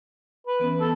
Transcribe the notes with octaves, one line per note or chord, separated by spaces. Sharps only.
B4
E3 B3 C#4
A4